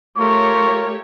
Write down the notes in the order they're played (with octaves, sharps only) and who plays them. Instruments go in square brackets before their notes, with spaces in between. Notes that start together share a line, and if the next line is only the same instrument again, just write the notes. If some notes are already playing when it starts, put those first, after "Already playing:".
[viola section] A3 G4 C#5 [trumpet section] F4 A#4 [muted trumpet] C#6